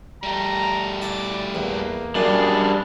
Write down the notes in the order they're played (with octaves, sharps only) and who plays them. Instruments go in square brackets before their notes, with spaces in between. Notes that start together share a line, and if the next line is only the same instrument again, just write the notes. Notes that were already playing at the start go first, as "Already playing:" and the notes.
[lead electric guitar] G3 A3 [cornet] A#5
[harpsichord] E4 A5 [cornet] D5
[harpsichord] E2 [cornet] A#3
[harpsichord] F#2 [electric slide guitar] G3 D4 G#4